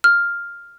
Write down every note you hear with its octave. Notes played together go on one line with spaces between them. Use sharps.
F6